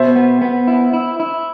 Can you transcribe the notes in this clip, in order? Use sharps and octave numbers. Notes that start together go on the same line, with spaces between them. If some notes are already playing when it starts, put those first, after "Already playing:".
Already playing: B2 C5 E5
B3
B3
E4
E4
E4